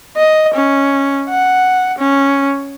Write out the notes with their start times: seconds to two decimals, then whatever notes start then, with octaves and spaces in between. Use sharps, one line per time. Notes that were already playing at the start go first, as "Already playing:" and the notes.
0.17 D#5
0.54 C#4
1.29 F#5
1.99 C#4